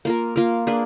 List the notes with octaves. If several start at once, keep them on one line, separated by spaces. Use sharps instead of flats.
A#3 F4 A#4
A#3 F4 A#4
A#3 D4 G#4 B4